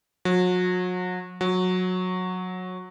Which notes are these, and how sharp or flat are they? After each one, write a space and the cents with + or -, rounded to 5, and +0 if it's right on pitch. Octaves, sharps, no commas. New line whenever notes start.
F#3 -35
F#3 -15